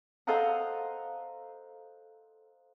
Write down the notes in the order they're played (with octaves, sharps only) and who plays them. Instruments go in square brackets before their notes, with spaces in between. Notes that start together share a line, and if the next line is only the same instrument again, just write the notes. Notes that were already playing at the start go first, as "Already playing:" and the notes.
[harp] A4 C5 D#5 F5 F#5 A#5